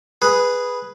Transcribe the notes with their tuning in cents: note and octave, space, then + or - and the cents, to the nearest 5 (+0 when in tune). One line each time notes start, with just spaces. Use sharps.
G#4 -5 B4 +0